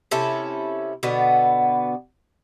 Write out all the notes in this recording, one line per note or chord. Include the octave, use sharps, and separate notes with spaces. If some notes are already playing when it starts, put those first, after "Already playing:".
C3 C#4 E4 A4
B2 D3 B3